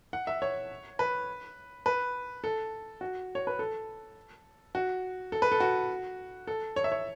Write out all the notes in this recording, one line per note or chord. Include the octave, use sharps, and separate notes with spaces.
F#5
E5
C#5
B4
B4
A4
F#4
C#5
B4
A4
F#4
A4
B4
A4
F#4
A4
C#5
E5
C#5